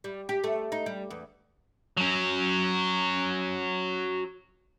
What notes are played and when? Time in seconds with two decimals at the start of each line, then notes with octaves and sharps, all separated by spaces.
0.04 G3
0.29 G4
0.44 A3
0.72 D#4
0.86 G3
1.10 E2
1.97 F#3 C#4